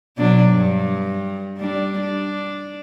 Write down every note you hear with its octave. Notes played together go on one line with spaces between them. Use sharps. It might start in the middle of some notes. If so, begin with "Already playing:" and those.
B2 F#3 D4
G2
G3 D4
D4